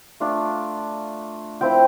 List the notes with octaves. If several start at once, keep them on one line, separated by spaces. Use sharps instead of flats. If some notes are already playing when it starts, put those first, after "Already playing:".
A3 D4 F4
F3 C4 E4 G5